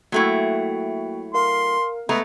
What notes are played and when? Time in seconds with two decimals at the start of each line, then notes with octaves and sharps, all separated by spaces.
0.12 F#3 A3 A#3 E4 F#4 G5
1.34 A#4 F5 C6
2.09 G#3 A3 B3 A#5